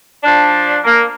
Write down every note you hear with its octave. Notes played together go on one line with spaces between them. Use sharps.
F3 D4
A#3